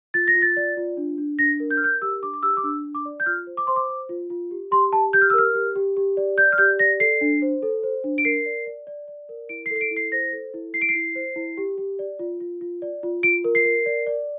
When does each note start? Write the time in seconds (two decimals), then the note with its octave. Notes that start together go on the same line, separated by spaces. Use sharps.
0.14 F4 A6
0.28 A#6
0.35 F4
0.42 A6
0.57 D5
0.77 F4
0.97 D4
1.18 D4
1.39 D4 A#6
1.60 A#4
1.71 G6
1.77 F6
1.81 A#4 G6
2.02 G4 E6
2.22 D4 D6
2.34 D6
2.43 G4 E6
2.57 D6
2.64 D4 E6
2.84 D4
2.95 D6
3.05 D5
3.20 G6
3.26 F4 F6
3.47 C5
3.57 D6
3.67 C5 C6
3.76 D6
3.89 C5
4.09 F4
4.30 F4
4.51 G4
4.71 G4 C6
4.92 G4 A5
5.13 G4 G6
5.21 F6
5.30 E6
5.34 A#4 F6
5.54 G4
5.76 G4
5.97 G4
6.17 D5
6.38 D5 G6
6.52 F6
6.58 G4 G6
6.79 D5 A#6
7.00 A4 C7
7.21 D4
7.42 C5
7.63 A4
7.83 C5
8.04 D4
8.18 D7
8.25 A#4 C7
8.46 D5
8.66 D5
8.87 D5
9.08 D5
9.29 A#4
9.49 E4 D7
9.66 C7
9.71 A4
9.76 C7
9.81 D7
9.91 E4
9.96 C7
10.12 C5 A#6
10.32 A4
10.54 E4
10.74 E4 C7
10.81 D7
10.89 C7
10.95 E4
11.15 C5
11.36 E4
11.57 G4
11.78 G4
11.99 D5
12.19 F4
12.40 F4
12.61 F4
12.82 D5
13.03 F4
13.23 F4 D7
13.44 A#4
13.55 C7
13.65 A#4
13.86 D5
14.07 D5